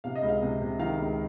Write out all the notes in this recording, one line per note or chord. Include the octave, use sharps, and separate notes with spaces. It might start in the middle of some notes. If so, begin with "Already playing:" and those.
C3 F5
D#5
C#2
F5
C3
C3
D#3 F5
C#2